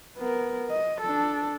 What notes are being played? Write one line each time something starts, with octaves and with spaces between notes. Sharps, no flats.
B3 A#4
D#5
D4 A4